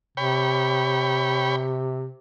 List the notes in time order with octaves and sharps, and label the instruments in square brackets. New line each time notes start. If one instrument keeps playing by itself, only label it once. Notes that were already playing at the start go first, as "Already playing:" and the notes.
[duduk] C3 [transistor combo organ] C#5 G5 B5